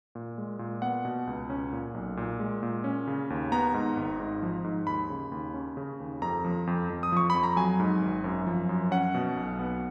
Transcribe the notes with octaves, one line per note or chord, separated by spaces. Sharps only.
A#2
G#3
A#2
B3 F#5
B2
C#2
C#4
A#2
B1
A#2
G#3
A#2
C#4
C#3
D#2
B3 A#5
G#2
G#1
G#2
F3
G#2
D#2 B5
C#3
D#2
C#4
C#3
D#2
F2 A#5
F3
F2
F2
D#6
F3 C#6
F2 B5
A#5
F#3 G#5
G#2
G#1
F#2
F3
F#2
C#4 F#5
B2
B1
B3